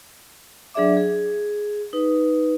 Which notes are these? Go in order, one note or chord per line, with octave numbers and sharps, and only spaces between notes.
F#3 D4 G#4 D5 E5 D6
G#4
D#4 B4